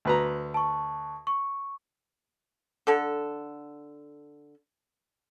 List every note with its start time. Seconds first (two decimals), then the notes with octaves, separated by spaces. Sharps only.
0.05 D2 B4 A#5
0.54 A5 C#6
1.27 C#6
2.87 D3 A4